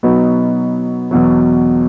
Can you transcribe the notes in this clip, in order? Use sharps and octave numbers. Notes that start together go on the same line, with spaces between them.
B2 F#3 B3 D#4
E2 B2 F#3